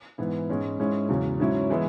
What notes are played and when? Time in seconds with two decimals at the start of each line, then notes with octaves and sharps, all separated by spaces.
0.18 G#2 E3 B3 E4
0.49 G#2 G#3 C#4
0.80 G#2 G#3 C#4 E4
1.09 E2 C#3 F#3 C#4
1.40 G#2 F#3 C#4 E4
1.70 E3 G#3 B3 E4